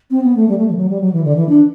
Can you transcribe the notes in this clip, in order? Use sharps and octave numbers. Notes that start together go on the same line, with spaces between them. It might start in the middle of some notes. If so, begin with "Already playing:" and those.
C4
B3
A3
G3
A3
G3
E3
F#3
G3
F#3
E3
D3
E3
D4